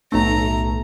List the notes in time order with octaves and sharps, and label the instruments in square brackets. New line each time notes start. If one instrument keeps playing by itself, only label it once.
[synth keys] B1 A3 [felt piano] A2 D#4 [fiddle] A#5